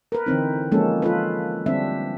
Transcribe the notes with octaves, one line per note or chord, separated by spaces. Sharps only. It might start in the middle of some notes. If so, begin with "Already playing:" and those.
A#4 B4
D3 E3 C4 D#4
F3 G#3 A#3 C#4 A4
F4 A4 B4
D3 G3 C4 D4 E5